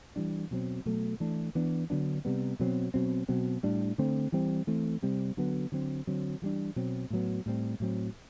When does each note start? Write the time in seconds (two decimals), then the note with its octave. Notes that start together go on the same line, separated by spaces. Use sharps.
0.16 E3 G3 D4
0.51 B2 F#3 C4
0.85 B2 F#3 A3
1.20 E3 A3 D4
1.55 E3 B3 D4
1.90 D3 F#3 B3 D4
2.25 C3 G3 B3
2.60 B2 F#3 A3 C4
2.94 B2 F#3 C4
3.28 B2 F#3 C4
3.63 A2 G3 D4
3.98 D3 A3 C4
4.32 E3 G3 C4
4.67 E3 A3 C4
5.02 C3 G3 C4
5.37 D3 F#3 B3
5.72 D3 F#3 C4
6.07 D3 F#3 C4
6.42 E3 G3 D4
6.76 B2 F#3 C4
7.10 A2 F#3 B3
7.46 A2 G3 C4
7.80 A2 F#3 C4